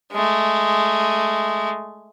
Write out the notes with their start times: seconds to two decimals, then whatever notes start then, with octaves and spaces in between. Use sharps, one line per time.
0.12 G#3 A3